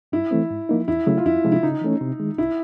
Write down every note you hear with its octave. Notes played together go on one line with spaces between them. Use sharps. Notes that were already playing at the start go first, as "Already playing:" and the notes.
G2 E4
E3 A3 C4
G#2
F3 A#3 D#4
E2 E4
C#3 F#3 A3
F4
F2 E4
C3 F3 G#3
E4
C#3 D#4
E3 A3 C#4
C3
D#3 G#3
C2 E4